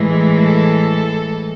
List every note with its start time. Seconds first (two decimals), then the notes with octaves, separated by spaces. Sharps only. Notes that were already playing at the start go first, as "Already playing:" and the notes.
Already playing: A2 E3 G#3
0.38 A4